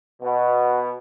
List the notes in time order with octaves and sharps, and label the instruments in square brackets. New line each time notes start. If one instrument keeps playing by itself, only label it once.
[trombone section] B2